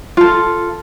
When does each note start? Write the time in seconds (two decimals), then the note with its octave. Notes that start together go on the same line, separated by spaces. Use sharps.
0.17 F4 A4